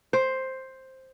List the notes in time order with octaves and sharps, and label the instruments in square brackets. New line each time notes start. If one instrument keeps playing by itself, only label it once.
[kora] C5